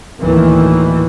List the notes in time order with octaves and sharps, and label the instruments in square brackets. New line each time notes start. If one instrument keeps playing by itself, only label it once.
[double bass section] D2 A2 D#3 E3 A#3